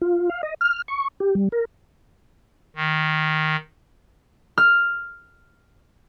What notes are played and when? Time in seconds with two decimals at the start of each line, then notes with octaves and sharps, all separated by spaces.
0.01 F4
0.30 F5
0.43 D#5
0.61 F6
0.88 C#6
1.20 G4
1.35 G3
1.52 A#4
2.76 D#3
4.58 F6